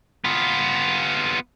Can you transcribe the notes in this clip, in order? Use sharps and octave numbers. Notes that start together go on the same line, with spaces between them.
B3 F4